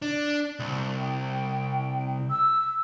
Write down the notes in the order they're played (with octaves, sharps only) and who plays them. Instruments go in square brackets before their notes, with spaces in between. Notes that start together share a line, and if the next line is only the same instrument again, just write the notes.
[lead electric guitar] D4
C2
[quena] G5
E6